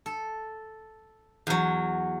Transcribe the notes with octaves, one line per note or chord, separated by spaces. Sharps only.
A4
E2 F#3